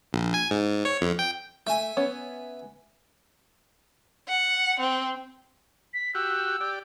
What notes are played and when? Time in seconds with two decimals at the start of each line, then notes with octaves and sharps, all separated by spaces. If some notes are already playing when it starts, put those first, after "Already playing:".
0.13 A#1
0.34 G#5
0.51 G#2
0.85 C#5
1.01 F2
1.19 G5
1.67 A3 E5 G#5
1.97 B3 C#4 C#5
4.29 F#5
4.80 C4
5.94 B6
6.15 F#4 G4 E6
6.61 G4 D5